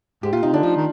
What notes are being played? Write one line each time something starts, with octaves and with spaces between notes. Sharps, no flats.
G#2 G4
A#2 F4
C3 D#4
D3 D4
F3 D#4
D#3